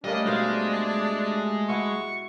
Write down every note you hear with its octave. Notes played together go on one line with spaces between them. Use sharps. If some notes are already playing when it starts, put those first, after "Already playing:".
G3 A3 A#3 C#4 D4 G4 D#5
B2 G#3 C5 F5
E4 F#4 C#6